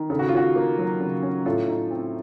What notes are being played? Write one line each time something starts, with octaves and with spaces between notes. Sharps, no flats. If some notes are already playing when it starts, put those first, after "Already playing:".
Already playing: D#3
C#3 A4
F#4
F4
C#4 F#4
A#3
F#3
C#3
C#4
A2 F4 A4
D#4
C4